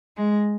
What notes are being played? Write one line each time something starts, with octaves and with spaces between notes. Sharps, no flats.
G#3